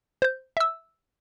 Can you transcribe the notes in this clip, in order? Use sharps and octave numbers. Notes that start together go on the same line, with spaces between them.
C5 G6
E5 E6